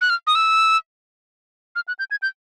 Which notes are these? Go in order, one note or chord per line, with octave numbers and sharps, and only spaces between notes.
F#6
F6
D#6
E6
F6
F#6
G6
G#6
G6